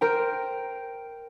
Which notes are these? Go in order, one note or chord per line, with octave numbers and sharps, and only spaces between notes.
A#4 C5 G5